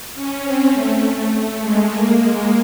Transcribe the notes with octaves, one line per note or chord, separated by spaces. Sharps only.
C#4
C4
A3
A3
A3
G#3
A#3
G#3